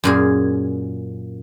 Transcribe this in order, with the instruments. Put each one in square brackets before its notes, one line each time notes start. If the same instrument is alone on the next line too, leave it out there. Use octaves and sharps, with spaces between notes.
[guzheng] F#2 A#2 G#4